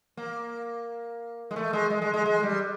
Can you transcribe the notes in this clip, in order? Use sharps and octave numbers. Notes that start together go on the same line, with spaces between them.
A#3
G#3
A3
G#3
G#3
G#3
G#3
G#3
G3